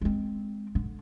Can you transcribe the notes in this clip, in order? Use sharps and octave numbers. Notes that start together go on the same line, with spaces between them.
G#3 C4
D3